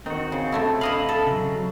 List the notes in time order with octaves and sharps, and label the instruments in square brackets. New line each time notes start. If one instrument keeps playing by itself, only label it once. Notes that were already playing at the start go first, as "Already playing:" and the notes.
[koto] D#3 [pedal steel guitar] C4 F#4
[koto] C#3
C3 A3 E4
[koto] E4 D#5 F5 [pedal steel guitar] B5
[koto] A4
[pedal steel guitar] C#3 F#3